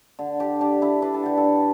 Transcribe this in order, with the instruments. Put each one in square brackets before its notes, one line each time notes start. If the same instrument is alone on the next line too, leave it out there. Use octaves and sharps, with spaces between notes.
[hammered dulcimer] D3
D4 G4
D4 G4
D4 E4
D4 B4
A4
D3 G4
A4
D3